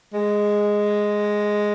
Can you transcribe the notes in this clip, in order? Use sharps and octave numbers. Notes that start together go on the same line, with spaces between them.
G#3